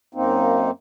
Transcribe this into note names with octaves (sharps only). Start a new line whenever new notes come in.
F#2 A#3 C4 D#4